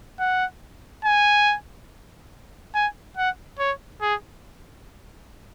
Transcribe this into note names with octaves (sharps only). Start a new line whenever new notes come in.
F#5
G#5
G#5
F#5
C#5
G#4